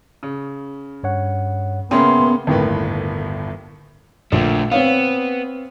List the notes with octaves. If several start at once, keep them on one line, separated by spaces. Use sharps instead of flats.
C#3
G2 C#5 F#5
C#3 A#3 B3 C#4 E5 G5 C6
G1 D#2 A2 A#3 B4
A#1 D3 A3
B3 C4 C#5 F5